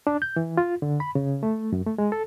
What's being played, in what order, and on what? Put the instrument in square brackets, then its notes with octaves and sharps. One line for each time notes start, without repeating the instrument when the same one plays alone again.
[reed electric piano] D4
G6
E3
F4
D3
B5
C#3
A3
F#2
A3
G#3
A4